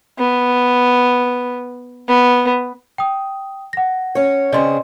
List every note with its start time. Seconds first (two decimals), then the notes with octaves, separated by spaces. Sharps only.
0.19 B3
2.08 B3
2.98 G5 D#6
3.73 F#5 A#6
4.15 C#4 C#5
4.53 C#3 C4 G#4 D5 D#5 C6